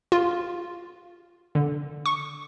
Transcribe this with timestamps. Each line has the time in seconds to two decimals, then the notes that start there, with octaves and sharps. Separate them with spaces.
0.12 F4
1.55 D3
2.06 C#6